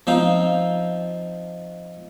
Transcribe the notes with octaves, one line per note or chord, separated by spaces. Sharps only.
F3 C4 D#4 F4